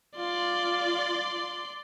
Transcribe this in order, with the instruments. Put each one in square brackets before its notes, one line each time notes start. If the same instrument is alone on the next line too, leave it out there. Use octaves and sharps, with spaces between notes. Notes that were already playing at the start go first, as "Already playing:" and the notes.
[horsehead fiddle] F4 [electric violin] D5 C6